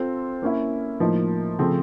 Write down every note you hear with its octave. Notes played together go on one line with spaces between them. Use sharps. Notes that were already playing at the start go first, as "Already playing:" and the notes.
Already playing: C4 F4 A4 C5
A#3 C#4 E4
A2 F3 A#3 D#4
C#3 F3 A3 C4